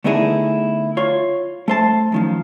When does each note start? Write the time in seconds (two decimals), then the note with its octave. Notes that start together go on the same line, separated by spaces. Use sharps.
0.04 D3 A3 B3 D#4 E4 G#4
0.97 F4 C#5
1.68 A3 C5 A5
2.12 F#2 D#3 F3